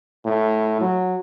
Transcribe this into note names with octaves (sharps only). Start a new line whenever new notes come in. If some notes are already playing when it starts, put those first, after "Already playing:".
A2
F#3